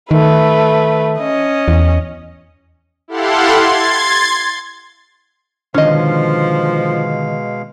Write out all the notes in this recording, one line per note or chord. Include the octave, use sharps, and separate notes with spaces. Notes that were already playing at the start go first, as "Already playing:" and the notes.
D#3 A3 B4
C#4 D#5
E2
E4 G4 A4 F5 F#5 C6
C6 G#6 A6
B2 D3 D#3 F3 G#3 C#4 D#5 F5